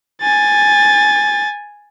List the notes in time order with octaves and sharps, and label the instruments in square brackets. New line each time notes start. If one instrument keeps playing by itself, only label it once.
[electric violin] G#5 A6